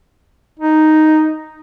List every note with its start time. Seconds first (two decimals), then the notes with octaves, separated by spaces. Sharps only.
0.59 D#4